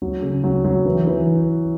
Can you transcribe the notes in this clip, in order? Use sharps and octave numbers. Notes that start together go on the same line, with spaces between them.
F#3
C#3
F#3
F#3
E3
E3